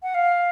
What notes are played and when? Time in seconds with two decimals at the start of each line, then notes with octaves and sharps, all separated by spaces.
0.03 F#5
0.14 F5